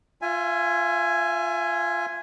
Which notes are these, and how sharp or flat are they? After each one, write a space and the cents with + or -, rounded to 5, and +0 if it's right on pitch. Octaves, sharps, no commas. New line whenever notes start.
F4 +0 E5 +30 G#5 +0